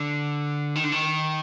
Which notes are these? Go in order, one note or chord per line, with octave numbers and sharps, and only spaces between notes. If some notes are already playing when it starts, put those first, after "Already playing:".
Already playing: D3
D#3
D3
D#3